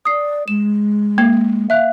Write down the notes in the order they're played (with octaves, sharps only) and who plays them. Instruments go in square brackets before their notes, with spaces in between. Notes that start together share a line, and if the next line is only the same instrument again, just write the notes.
[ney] D5 [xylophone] D#6 C7
[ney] G#3 [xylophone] E7
[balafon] A#3
[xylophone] E5 F#6 [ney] F5